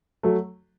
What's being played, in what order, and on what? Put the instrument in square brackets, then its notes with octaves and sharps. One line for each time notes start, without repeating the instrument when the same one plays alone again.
[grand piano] F#3 A3